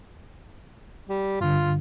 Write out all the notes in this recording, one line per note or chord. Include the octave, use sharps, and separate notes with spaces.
G3
G2 D3 F4